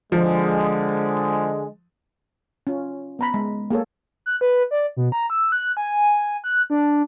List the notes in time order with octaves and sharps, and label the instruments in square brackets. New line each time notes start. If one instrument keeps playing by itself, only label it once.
[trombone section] D3 G#3 [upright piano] F3
[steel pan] C#4 F4
B3 A#5 B5
G#3
A#3 G#4 A4 C#5
[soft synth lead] F#6
B4
D5
B2
A#5
E6
F#6
G#5
F#6
D4